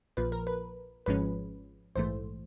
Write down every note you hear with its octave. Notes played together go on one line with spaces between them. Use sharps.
A#1 A#2 F3 B4
A#4
B4
G#1 G#2 F3 G#3 C#4 B4
A#1 G#2 E3 A3 C5